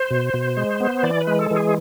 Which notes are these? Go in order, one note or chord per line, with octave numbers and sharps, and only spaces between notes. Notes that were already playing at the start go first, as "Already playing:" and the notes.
Already playing: C5
B2
B2
G#3
B3
E3 D5
B4
G#3
A4
E3
G#4